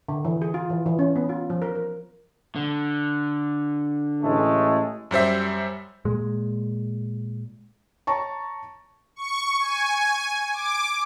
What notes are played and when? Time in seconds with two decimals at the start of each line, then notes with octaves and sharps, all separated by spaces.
0.08 D3
0.25 E3
0.42 G#4
0.54 F4
0.70 E3
0.86 E3
0.99 C#4
1.16 B3
1.29 F4
1.50 F3
1.62 A#4
1.75 A#4
2.56 D3
4.21 A1 G#3 A3
5.11 F#2 G3 C5 E5
6.05 A#2 G#3
8.07 C#5 A5 A#5 C#6
9.16 C#6
9.60 G#5
10.53 D6